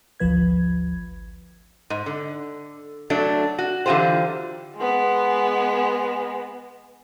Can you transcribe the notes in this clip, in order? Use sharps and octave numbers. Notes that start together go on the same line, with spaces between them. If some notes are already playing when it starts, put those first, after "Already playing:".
G#1 D2 F3 B4 G#6
G#2
D3
F#3 A3 D4
F#4
D3 E3 F#3 F4 G4 C5
G#3 B3